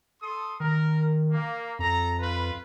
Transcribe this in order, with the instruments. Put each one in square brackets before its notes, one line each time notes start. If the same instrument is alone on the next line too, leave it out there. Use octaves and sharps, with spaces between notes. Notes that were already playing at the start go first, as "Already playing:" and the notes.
[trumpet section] A4 C6 D#6
[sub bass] D#3 [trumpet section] A#4
[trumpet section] A#3
[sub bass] F2 [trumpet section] A4 A#5
[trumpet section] F4 B4